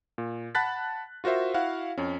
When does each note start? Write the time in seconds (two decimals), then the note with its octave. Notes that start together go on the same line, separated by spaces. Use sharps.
0.18 A#2
0.55 F#5 A5 B5 F#6 A6 B6
1.24 F4 F#4 A#4 C5 E5
1.54 E4 F#4 F5 F#5
1.98 F2 C#4